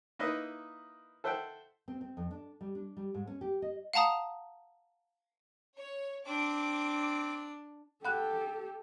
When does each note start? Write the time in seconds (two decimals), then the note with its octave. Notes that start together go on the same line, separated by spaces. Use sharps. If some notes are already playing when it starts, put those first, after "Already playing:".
0.19 A#3 D#4 E4 B4 D#5 E5
1.24 A4 C5 E5 F#5 G5
1.88 C4
2.01 C4
2.17 F2
2.31 D4
2.61 G3
2.75 D4
2.97 G3
3.14 G#2
3.27 C#4
3.41 G4
3.62 D#5
3.93 F5 F#5 A5 A#5 D#6
5.76 C#5
6.26 C4 D4 D6
8.05 G4 A4 F#5 B5 F#6